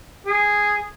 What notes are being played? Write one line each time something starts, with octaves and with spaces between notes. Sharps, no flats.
G#4